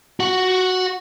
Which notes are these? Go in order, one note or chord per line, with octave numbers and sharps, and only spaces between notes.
F#4 F#5